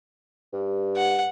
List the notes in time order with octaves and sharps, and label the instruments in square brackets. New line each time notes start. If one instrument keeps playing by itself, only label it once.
[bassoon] G2
[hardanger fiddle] F#5